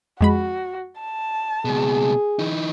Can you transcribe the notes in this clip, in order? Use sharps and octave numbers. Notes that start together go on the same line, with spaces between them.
F2 G#3 F#4 B5
A5
C#2 B2 G#4
E3 D#4